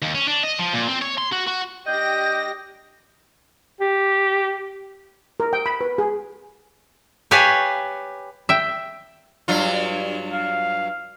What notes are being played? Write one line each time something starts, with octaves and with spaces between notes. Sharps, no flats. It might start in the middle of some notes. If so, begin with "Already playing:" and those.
D#2
C#4
D4
D#5
F3
A#2
C4
C#5
C6
F#4
F#4
G3 D4 G4 D#5 G6 A#6
G4
A#4
G5
B5
B4
G#4
G4 B4 C#5 F5 G#5 A5
E5 G5
G2 F#3 F4
F5